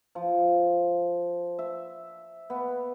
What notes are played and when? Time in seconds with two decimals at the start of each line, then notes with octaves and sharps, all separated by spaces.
0.15 F3
1.59 E5
2.50 B3